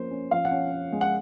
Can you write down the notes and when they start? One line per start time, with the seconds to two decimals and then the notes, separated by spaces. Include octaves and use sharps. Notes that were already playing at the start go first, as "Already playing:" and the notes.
Already playing: F3 A#3 C#4 C5
0.11 C#4
0.31 F3 F5
0.45 F#5
0.51 C#4
0.72 C#4
0.92 G#3
1.01 F#5